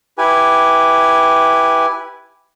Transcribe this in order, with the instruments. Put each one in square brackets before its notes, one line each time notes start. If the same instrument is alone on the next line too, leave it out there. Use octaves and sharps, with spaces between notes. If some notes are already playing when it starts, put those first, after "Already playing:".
[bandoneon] E4 G4 B4 G#5